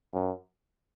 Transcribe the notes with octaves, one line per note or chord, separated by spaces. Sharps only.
F#2